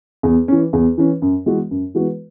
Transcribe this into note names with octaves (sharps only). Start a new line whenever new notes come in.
E2
E3 C#4
E2
E3 C#4
F#2
E3 G#3 B3 F#4
F#2
E3 G#3 B3 F#4